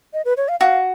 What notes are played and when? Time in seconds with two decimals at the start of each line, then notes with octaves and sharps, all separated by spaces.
0.13 D#5
0.25 B4
0.37 C#5
0.48 F5
0.60 F#4 F5